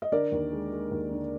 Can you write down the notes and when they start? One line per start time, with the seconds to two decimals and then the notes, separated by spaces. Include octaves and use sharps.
0.02 D#5
0.12 D3 A#4 D5
0.32 D#2
0.52 G#3
0.72 G#3
0.91 D#2
1.11 D3